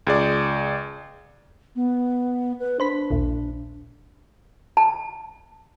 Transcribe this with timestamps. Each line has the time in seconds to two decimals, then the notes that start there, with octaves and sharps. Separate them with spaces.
0.07 C#2 G#4 D5
1.76 B3
2.60 B4
2.80 D4 C5 B5 B6
3.10 A#1 D#2 A#2
4.77 A5